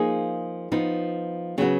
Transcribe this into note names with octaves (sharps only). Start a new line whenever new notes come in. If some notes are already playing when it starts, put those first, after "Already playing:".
Already playing: F3 A#3 D#4 G#4
F3 B3 D#4
C#3 F#3 B3 F#4